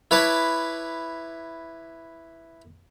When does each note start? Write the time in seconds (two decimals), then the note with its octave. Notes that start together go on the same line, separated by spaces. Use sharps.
0.11 E4 B4 C#5 A5 D6